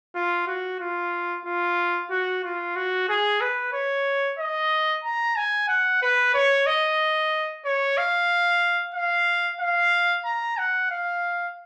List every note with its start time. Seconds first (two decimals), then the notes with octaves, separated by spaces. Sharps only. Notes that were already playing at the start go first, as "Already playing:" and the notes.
0.15 F4
0.47 F#4
0.80 F4
1.45 F4
2.10 F#4
2.43 F4
2.76 F#4
3.09 G#4
3.41 B4
3.73 C#5
4.39 D#5
5.04 A#5
5.36 G#5
5.68 F#5
6.02 B4
6.34 C#5
6.66 D#5
7.65 C#5
7.97 F5
8.94 F5
9.60 F5
10.25 A#5
10.58 F#5
10.90 F5